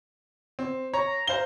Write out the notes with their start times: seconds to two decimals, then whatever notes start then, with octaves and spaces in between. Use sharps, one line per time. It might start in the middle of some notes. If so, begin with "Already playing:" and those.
0.59 C4
0.94 C#5 A#5
1.27 C5 F5 G7